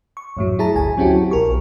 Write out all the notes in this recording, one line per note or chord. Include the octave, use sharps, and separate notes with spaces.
C#6
F#2 A2 F#3
E4 G#4 A5 A#5
G1 D2 G#5 A5
F#3 C4 C#4 E4 F#4 G4
B1 A#4 C#6